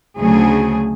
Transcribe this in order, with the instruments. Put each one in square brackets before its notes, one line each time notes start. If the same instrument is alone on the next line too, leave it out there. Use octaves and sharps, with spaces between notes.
[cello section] D2 C#3 F#3 A3 G#4